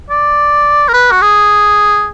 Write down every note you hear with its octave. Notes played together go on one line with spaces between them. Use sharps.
D5
A#4
B4
F#4
G#4